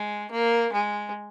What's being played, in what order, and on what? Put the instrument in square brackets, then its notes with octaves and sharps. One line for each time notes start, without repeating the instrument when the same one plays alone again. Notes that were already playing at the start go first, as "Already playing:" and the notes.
Already playing: [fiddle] G#3
A#3
G#3